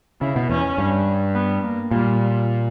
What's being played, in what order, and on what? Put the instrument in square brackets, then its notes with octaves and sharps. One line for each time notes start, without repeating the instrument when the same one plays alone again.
[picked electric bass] C#3 [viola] E4
[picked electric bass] B2
[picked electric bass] E2 [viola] C#4
[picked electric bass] G2
[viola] B3
A#3
[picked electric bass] A#2 [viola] G3